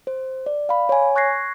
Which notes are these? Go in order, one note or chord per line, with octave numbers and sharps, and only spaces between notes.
C5
D5
F5 B5
C#5 G#5
C#6 F#6 G#6 A#6 C7